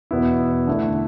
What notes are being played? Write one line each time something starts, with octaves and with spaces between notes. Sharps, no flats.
E2 B2 B3 E4
D3 A3 E4